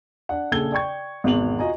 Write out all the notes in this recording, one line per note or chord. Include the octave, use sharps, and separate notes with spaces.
D4 F#5
A#1 C#3 A4 A5 G#6 G7
D5 G5 C#6 G#6
G#1 E2 B2 F7 F#7
F4 F#4 D#5 G#5 A#5